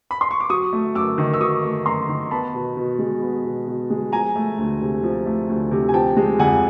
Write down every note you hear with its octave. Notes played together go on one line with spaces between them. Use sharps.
B5
C6
C#6
D6
F#3 C#6 D#6
A3
F#2 D6 E6
D#3
E6
F#3 C#6 D#6
A3
F#2 A#5 C6
D#3
B3 A5 B5
B2
B2
G#3
B3
B2
B2
G#3
F3 G#5 A#5
A3
D2
C3
F3
A3
D2
C3
G#5
F3 G5 A5
G#3
F2 F#5 G#5